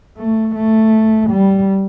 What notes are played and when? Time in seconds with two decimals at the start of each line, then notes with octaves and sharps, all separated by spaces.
0.17 A3
0.55 A3
1.30 G3